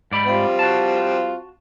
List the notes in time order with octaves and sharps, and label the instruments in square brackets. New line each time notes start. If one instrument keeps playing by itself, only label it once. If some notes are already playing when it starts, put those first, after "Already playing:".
[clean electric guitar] G#2 D5 B5
[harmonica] G3 C4 F4
[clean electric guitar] F#4 A5